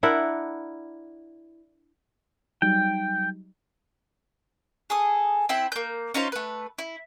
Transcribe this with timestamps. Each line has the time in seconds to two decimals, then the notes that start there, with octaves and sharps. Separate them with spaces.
0.03 D4 E4 A#4 F#5
2.62 F#3 G3 D#4 G5
4.90 G#4 A4 D#6
5.49 C4 E4 E5 G5
5.72 A#3 G6
6.14 C#4 D#4 F4 C5
6.32 A3 B4
6.79 E4